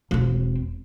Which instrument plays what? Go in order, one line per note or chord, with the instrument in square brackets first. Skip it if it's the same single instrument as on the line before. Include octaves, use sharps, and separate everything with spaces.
[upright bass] E1 C4